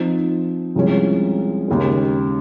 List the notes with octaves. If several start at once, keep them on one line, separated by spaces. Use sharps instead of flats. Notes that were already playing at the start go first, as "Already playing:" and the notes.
Already playing: F3 C4 D#4
C2 C3 F3 G#3 C#4
D#2 C#3 G#3